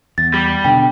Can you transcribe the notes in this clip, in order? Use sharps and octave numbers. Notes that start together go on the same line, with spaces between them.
E2 A6
G3
B2 D3 G5